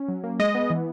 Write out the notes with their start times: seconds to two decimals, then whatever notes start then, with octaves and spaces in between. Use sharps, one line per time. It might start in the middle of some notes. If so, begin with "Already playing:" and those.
Already playing: C#4
0.08 F#3
0.24 A#3
0.39 G#3 D#5
0.55 B3
0.70 E3